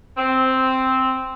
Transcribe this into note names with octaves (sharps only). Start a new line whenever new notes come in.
C4